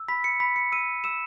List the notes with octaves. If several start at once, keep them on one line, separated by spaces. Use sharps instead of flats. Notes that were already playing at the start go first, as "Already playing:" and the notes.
Already playing: E6
B5 B6
C#7
B5 B6
C#7
E6 D#7
E6 E7